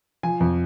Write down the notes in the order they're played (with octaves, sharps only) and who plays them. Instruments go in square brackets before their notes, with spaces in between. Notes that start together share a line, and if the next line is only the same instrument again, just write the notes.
[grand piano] F3 G#5
F2